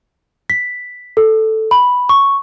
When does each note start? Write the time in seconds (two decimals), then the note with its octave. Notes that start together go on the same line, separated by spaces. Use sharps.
0.50 B6
1.17 A4
1.71 B5
2.09 C#6